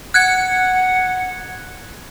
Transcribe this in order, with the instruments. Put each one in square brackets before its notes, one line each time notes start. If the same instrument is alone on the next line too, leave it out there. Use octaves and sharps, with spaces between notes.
[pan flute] F#5 [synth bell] F#6 G#6 C#7